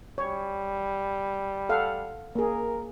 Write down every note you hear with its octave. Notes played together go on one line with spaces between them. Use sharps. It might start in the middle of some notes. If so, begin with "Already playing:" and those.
G3 C#5
A4 F5 F#5
A#3 G#4 A#4